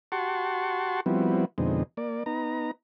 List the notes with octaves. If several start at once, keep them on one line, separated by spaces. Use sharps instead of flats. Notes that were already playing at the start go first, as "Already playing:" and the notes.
F#4 G4 F#5 A5 C6 C#6
F3 G3 B3 C4 E4 F#4
F2 B2 D3 G#3 C4 D#4
A#3 D5
B3 D#4 A#5